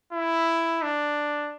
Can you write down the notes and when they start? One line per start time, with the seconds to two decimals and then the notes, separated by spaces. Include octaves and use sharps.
0.13 E4
0.83 D4